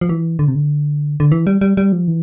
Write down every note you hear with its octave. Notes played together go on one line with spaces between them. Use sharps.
F3
E3
D3
C3
D3
D3
E3
G3
G3
G3
F3
E3